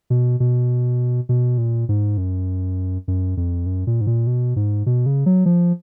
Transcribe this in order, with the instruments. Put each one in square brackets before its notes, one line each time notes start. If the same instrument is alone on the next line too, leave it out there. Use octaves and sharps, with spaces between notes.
[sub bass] B2
B2
B2
A#2
G#2
F#2
F#2
F2
F#2
A#2
G#2
A#2
B2
G#2
B2
C#3
F#3
F3